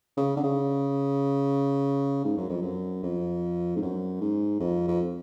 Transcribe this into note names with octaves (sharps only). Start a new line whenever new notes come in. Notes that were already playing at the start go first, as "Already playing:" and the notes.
C#3
D3
C#3
G#2
F#2
F2
F#2
F2
G#2
F#2
G#2
F2
F2